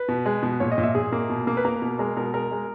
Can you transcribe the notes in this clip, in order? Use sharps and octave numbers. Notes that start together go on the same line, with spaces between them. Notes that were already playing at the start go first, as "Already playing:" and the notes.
Already playing: B4
B2
G#3
B2
A#2 C#5
D#5
A#2
E5
A#2 G#4
A#3
B2
A#3
B4
A#3 A#4
B2
G#3 A#4
B2 A#4
G#3 A#4
G#3